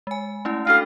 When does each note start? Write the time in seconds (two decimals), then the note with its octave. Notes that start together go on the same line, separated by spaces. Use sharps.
0.07 G#3 G#5
0.45 A3 C#4 E4
0.67 D4 F#4 A4 F5